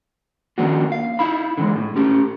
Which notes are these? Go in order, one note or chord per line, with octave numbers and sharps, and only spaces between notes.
D#3 F3 A#3 C#4 D4 F#4
F5
D#4 E4 F5 B5
D3 E3 G#3
A2
A3 C#4 G4